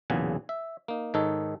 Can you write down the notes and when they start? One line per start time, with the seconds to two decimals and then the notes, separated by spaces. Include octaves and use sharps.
0.10 B1 E2 A#2 C#3 F#5 G#5
0.49 E5
0.88 A#3 D#4
1.14 G#2 D#3 D#4 A4 C#5